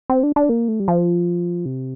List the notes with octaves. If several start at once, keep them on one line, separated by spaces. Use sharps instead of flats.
C4
D4
D4
A#3
A3
G3
F3
C3